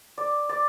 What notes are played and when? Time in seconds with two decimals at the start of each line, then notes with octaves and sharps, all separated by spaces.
0.18 D5
0.49 D5